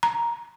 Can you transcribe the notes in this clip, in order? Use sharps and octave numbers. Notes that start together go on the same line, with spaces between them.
A#5